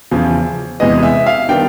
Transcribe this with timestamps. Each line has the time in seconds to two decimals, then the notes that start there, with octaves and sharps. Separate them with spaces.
0.11 E2 C#3 F3
0.80 E2 C3 E3 G#3 B3 D#5
1.03 E5
1.26 F5
1.49 D#3 G3 B3 D4 G5